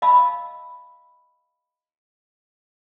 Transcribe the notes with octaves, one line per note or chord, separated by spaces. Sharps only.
D#5 F5 A5 B5 E6